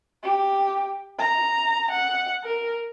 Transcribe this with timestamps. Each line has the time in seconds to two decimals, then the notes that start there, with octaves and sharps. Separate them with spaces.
0.24 G4
1.19 A#5
1.91 F#5
2.44 A#4